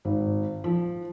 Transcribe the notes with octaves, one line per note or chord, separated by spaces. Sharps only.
G#1
F3